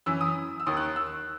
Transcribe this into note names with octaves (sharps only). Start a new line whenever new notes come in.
F#2 E3 E6
D#6
E6
D#2 D#3 D#6
F#6
E6